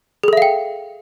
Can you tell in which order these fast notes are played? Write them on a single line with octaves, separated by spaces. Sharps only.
G#4 A4 E5 F5 G5